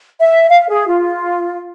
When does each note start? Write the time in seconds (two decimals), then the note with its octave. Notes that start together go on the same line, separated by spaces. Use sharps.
0.20 E5
0.49 F5
0.69 G#4
0.87 F4